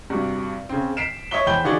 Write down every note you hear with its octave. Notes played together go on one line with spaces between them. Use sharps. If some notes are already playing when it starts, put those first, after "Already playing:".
G2 C3 F#4
C#3 C4
B6 C7 D7 E7
C#5 D#5 E5 C#6 B6 G7
E2 C5 G5 B5 G6 G7
D3 E3 D#4 F#4 G#4 D5